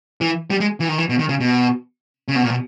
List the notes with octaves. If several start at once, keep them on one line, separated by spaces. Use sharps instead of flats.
E3
G3
G#3
E3
D#3
E3
B2
D#3
C#3
B2
C#3
B2
A#2
B2